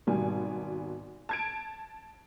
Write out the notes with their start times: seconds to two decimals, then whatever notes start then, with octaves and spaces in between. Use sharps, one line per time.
0.07 G#1 B2 G3 G#5
1.29 A5 G#6 D7